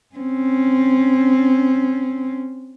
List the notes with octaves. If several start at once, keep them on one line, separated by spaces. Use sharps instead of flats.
C4 C#4